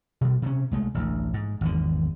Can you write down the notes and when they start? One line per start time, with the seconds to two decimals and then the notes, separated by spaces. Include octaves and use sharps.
0.21 B2 G3
0.42 C3 C#4
0.71 C2 G#3 A3
0.94 A1 D2
1.34 G#2
1.61 G#1 E2 D3